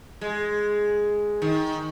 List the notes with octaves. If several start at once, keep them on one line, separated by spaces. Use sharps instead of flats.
G#3
D#3